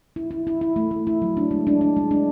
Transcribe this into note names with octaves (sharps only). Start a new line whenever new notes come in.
E4
E4
E4
E4
A3
A3
E4
F#3
D4
G#3
D4
D4
G#3
D4